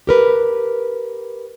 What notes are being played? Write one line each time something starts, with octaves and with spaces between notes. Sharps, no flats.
G4 A#4 B4